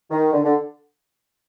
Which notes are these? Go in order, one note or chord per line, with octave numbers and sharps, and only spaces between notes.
D#3
D3
D3